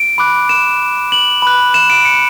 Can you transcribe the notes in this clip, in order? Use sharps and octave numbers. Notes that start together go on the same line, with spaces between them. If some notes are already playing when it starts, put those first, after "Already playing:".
Already playing: D7
B5 D6 F#6
E7
F#7
B5 F#6
E7
D7
C#7